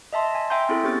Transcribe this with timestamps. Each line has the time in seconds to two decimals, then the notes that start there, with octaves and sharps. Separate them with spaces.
0.13 D#5 E5 A5 C6
0.35 G#5
0.50 E5 G5 G#5 A#5 C6 G6
0.69 C4 E4 G#4 A4
0.83 B3 C#4 G4 C#6 A6